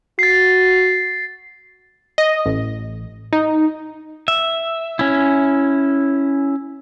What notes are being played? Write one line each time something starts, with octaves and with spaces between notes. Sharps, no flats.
F#4 A6 C7
D#5
A1
D#4
E5
C#4 E4